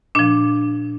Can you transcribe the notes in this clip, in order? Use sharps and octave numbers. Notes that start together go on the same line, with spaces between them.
A#2 F3 D4